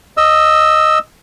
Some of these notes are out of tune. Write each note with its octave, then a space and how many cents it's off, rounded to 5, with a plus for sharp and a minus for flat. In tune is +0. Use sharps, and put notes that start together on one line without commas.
D#5 +0 E6 +0